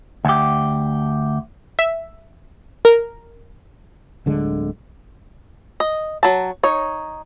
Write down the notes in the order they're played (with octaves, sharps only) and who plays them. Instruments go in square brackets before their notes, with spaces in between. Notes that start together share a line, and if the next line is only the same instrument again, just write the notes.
[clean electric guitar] D2 G4
[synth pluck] E5
A#4
[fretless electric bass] D1 D3 G#3
[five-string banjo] D#5
F#3 A5
D#4 C#5